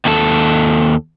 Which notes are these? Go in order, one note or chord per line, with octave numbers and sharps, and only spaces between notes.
D#2 A4